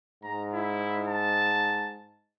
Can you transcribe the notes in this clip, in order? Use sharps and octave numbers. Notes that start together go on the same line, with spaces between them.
G#2 A#5
E4
A5